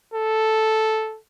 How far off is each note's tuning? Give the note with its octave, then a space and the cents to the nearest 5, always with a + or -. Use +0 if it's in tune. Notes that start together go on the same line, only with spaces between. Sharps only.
A4 -5